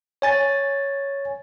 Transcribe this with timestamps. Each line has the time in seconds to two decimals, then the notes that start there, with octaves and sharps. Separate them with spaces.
0.22 C#5 G#5 A6